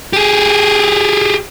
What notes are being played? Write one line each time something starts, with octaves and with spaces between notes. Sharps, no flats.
G4 G#4